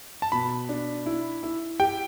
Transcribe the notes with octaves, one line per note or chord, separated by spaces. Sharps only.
A5
B2 B5
D4
E4
E4
G4 G5